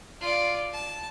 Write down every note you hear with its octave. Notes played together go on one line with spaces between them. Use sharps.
F4 D5
A5